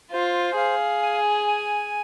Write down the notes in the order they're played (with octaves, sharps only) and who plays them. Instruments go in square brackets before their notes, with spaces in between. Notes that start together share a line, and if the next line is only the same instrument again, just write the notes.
[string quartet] F4 [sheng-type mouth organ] C5
[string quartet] G#4 [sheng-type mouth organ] F5
[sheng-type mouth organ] G#5
G#5